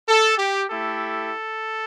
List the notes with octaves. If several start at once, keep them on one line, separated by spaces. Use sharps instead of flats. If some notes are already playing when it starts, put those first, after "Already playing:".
A4
G4
A3 E4 G4 A4